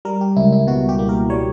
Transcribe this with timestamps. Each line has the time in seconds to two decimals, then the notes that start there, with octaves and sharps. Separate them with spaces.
0.05 G3 A#4
0.21 G4
0.36 C#2 E4
0.52 E4
0.67 B2 F#4
0.89 G4
0.99 A#3
1.09 A#4
1.30 G3 C#5